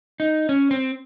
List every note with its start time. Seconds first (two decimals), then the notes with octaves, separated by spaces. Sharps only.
0.20 D#4
0.49 C#4
0.71 C4